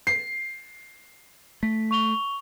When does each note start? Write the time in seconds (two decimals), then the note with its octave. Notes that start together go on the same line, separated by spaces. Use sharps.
0.07 C7
1.63 A3 B6
1.91 C#6 F7 G7